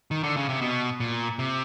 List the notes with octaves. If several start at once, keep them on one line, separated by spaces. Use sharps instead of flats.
D#3
D3
C#3
C3
B2
A#2
C3